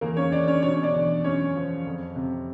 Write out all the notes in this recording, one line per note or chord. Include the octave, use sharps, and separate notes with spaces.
E2 A#3 A#4
C#4 C#5
E2 D4 D5
C#4 C#5
B2 C#4 C#5
D4 D5
E2
F#2 C#4 C#5
F3
F2
C3